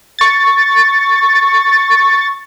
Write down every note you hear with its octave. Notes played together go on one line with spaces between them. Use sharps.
C#6 A6